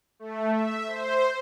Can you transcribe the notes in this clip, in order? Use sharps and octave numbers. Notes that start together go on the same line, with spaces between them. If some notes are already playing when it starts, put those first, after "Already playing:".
A3
E5
C5